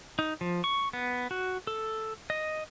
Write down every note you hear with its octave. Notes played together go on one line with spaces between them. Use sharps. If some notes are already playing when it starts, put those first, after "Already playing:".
D#4
F3
C#6
B3
F#4
A4
D#5